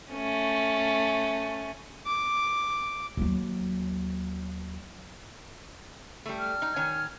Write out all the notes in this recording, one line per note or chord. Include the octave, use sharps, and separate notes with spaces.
A3 C#4
D6
D#2 F#3
G3 A3
F6
D#4
D#3 C#5 G#5